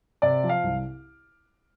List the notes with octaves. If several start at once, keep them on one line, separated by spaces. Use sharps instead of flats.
C3 D5
F3
F5
C2